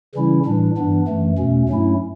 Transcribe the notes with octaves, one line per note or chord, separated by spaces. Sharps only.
C#3 E3 G3 C#4 E4
A2 E3 G3 D4
G2 E3 B3 D4
F#2 E3 A3
E2 B2 A3 C#4
G2 F#3 A3 C#4 E4